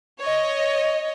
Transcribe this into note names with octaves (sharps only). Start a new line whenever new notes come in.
C#5 D#5